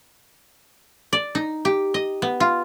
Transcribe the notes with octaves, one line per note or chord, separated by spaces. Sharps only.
D5
D#4
G4
D#5
B3
F4